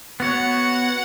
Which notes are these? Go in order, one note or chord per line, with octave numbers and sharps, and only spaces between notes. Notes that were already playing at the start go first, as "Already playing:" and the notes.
B3 F#4 C#5 F#5